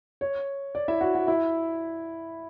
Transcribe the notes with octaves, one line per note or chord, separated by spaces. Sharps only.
C#5
D5
E4 E5
F#4 F#5
F#4 F#5
E4 E5